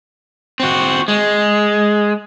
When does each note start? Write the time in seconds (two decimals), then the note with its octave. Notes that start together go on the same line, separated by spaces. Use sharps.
0.60 C4 F#4
1.08 G#3